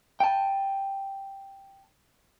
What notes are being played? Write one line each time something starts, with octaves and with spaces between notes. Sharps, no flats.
G5 A5